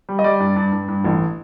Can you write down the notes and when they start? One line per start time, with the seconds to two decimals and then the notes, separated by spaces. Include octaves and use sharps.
0.09 G3
0.19 D#5
0.24 G3 D5
0.40 G2
0.56 G2
0.72 G2
0.88 G2
1.04 A1